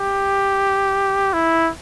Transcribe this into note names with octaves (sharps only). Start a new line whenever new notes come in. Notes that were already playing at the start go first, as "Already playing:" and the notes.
Already playing: G4
E4